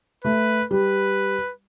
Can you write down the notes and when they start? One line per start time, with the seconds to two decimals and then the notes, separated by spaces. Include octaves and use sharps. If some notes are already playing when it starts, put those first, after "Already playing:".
0.24 A3 B4
0.70 G3 B4